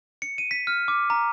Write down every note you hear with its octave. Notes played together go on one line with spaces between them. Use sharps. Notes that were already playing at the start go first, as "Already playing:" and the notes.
C#7
D#7
B6
F6
D6
A#5